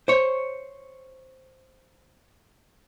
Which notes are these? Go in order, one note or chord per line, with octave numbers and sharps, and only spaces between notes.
C5 C#5